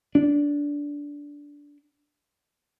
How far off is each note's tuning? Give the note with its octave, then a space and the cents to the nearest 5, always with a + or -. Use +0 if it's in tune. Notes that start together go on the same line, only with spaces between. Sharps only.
D4 -15